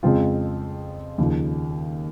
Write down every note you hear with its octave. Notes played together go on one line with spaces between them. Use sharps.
F2 C#3 G#3 C4 F4
D#2 C#3 F3